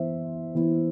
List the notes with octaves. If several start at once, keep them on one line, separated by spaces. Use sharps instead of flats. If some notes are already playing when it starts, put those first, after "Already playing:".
Already playing: E3 B3 E4 C5 E5
E3 B3 E4